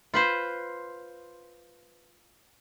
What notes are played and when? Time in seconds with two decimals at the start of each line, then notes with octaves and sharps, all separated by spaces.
0.14 F4 B4 C5